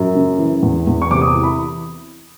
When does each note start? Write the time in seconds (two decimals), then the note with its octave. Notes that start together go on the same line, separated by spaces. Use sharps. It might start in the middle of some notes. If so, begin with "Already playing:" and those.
Already playing: F#2
0.15 C#3
0.38 E3
0.62 E2
0.87 E2
1.02 C#6
1.11 C3 D6
1.21 D#6
1.27 D6
1.35 E3
1.43 B5